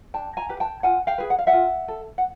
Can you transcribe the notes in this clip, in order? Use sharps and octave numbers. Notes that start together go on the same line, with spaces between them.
D4 G5 A5
G#5 A#5
G4 B4
G5 A5
F4 F#5 G#5
F5 G5
G#4 B4
F#5
F5
E5 F#5
F4
A4
F#5